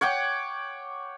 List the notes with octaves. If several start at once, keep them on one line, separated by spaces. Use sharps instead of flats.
C#5 F#5 G5 D6